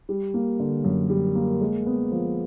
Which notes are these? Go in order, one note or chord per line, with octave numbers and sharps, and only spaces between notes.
G3
A#3
D3
F#2
G3
A#3
G#3
B3
F3